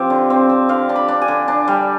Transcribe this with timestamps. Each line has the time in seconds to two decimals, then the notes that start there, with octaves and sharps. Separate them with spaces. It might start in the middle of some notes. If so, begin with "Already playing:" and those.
Already playing: F3 C4 F4 G4
0.10 D3
0.30 C4
0.49 C4
0.69 D3 F5
0.89 D4
0.96 B5
1.08 D4
1.22 G#5
1.28 D3
1.48 D4
1.68 G3